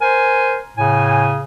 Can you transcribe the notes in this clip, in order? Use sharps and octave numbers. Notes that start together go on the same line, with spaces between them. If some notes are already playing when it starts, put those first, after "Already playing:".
A#4 C5 G#5
A2 C#3 G#5